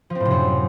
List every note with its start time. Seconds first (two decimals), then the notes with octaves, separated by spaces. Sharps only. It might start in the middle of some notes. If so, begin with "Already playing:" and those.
0.10 F3
0.15 C4
0.20 A2
0.25 C3
0.30 F#2